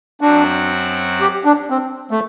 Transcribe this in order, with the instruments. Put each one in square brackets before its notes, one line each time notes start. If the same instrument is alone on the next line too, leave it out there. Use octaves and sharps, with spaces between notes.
[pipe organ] F#2 F#3 C4 F#4 [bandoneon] D4
[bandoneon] G4
D4
C4
A3